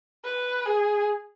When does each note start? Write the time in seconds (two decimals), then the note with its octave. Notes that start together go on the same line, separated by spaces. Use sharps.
0.24 B4
0.65 G#4